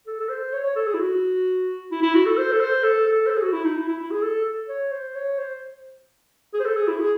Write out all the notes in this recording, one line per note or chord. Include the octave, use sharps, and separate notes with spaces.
A4
A4
C5
C#5
C#5
A4
G#4
E4
F#4
E4
E4
F#4
A4
C5
A4
C5
A4
A4
C5
A4
G#4
F#4
E4
D#4
E4
E4
E4
G#4
A4
C#5
C5
C#5
C5
G#4
C5
A4
G#4
E4
G#4